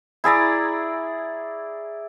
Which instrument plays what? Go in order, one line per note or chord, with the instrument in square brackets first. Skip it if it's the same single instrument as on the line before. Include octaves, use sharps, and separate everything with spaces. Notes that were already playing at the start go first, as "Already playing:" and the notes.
[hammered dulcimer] E4 G#4 D5 A#5